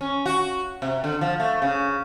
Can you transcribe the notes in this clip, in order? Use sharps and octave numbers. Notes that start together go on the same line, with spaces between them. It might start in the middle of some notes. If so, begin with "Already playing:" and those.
C#4
F#4
C3
D3
F3
A3
C#3